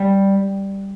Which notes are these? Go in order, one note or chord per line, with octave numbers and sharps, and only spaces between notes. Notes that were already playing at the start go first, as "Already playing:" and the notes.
Already playing: G3